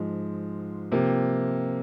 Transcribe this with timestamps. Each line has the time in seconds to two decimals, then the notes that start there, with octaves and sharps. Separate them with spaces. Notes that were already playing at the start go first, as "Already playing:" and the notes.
Already playing: G#2 F3 G#3
0.92 C3 F3 A#3